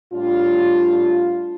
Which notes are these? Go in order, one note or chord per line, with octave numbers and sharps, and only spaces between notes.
A2 G3 D4 F4